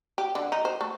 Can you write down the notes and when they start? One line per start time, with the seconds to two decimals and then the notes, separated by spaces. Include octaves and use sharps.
0.18 G4
0.35 D3
0.52 D#4
0.65 C5
0.81 A3